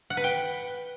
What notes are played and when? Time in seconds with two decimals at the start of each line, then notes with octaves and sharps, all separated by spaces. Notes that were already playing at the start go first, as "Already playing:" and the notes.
0.10 F#5
0.17 B4
0.24 G5